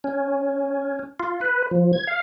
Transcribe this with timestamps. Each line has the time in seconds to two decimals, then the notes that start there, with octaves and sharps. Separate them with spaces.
0.04 C#4
1.20 F4
1.41 B4
1.71 F3
1.93 G#6
2.07 F5